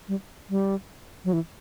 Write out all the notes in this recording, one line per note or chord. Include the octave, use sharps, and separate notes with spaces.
G3
G3
F#3
E3